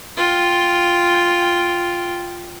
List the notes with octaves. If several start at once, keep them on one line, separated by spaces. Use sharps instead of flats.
F4 G5